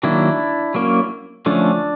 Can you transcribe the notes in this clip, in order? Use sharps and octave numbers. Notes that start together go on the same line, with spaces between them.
D#3 F#3 A#3 D4 E4
F#3 A#3 C#4
D3 F3 A3 C#4 D4